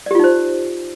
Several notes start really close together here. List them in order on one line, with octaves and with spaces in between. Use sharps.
D5 G4 F4 D#4 C5